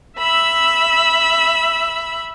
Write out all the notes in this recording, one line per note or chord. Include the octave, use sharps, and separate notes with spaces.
E5 B5 E6